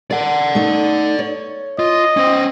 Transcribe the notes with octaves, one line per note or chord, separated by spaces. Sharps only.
A#4 D5 F#5
A3 D#4
C#5
F4 D#5
C#4 C5